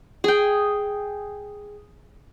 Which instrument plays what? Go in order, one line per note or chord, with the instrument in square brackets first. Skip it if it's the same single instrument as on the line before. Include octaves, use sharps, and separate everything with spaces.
[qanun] G#4 G5